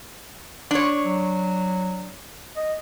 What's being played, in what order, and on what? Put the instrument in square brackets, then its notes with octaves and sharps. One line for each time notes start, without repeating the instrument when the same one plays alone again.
[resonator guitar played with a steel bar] D4 C#5
[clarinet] F#3
D#5